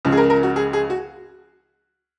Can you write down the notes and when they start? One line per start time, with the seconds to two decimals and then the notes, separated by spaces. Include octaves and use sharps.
0.05 C#2 C#3 F3
0.12 G#4
0.17 A#4
0.30 A#4
0.43 F#4
0.56 G#4
0.73 G#4
0.90 F#4